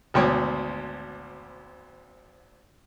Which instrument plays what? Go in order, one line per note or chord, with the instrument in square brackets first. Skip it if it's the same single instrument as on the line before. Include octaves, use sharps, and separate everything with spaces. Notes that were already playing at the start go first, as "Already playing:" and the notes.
[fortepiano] G#1 D2 B2 C#5 G5 C#6